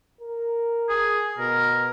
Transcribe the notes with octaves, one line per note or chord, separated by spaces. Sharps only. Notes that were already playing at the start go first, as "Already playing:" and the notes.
A#4
G#4
B2 A#4